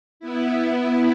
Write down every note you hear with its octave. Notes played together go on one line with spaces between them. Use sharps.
B3 E4